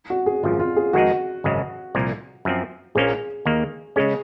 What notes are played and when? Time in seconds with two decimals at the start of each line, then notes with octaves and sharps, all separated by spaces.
0.10 F#4
0.26 G#4
0.43 G#1 F#2 F3 F4
0.60 F4
0.76 G#4
0.93 F2 D#3 G#3 D#4 F#4 G#4
1.44 G#1 F#2 C#3 G#3
1.95 C2 A#2 F3 A#3
2.45 F#2 F3 C4
2.95 A#1 A#2 F3 A#3 C#4 G#4
3.45 D#2 D#3 A#3
3.96 C#3 G#3 C#4 G#4